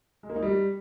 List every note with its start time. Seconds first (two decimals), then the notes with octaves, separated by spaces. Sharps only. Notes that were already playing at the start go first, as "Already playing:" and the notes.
0.23 G#3
0.30 A#3
0.36 D#4
0.42 G3